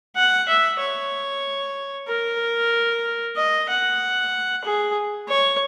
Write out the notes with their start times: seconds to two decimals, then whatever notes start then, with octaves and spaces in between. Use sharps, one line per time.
0.16 F#5
0.48 E5
0.79 C#5
2.08 A#4
3.36 D#5
3.69 F#5
4.64 G#4
5.29 C#5